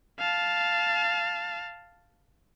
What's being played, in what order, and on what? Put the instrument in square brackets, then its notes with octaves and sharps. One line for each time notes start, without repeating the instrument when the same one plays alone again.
[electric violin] F5 A5